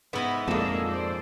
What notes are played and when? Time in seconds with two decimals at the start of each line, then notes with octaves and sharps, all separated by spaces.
0.13 G#2 B3 E4 D#5
0.48 F2 A#2 G#3 A#3 G#4 A4
0.89 C5 D5